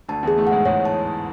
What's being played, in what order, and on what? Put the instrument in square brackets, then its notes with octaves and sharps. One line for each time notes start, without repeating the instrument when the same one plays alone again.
[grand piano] D2 D3 [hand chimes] A5
[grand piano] E2 E3 [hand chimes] G#4
[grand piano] A2 A3
[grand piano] G#2 G#3 [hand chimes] F#5
[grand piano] G#2 G#3 [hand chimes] C#5
[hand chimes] A5